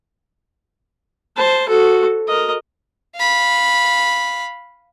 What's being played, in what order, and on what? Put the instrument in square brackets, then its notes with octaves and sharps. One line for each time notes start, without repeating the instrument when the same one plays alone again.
[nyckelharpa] C5 A5
F#4 A4
A#4 D#5
[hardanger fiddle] F5 B5